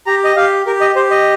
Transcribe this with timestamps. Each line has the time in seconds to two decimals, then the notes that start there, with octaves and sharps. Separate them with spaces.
0.06 G4 A#5
0.24 D#5
0.36 G4 F5
0.66 G4 A#4
0.81 D#5
0.96 G4 C5
1.11 D#5